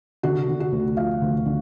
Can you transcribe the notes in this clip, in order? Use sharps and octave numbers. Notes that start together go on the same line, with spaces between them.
D3 F#4
D3
F#4
D2
F3 F5
D2
D3